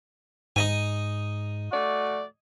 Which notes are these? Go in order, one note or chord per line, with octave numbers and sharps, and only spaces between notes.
G#2 D#4 D#5 G#5
A3 F#4 D5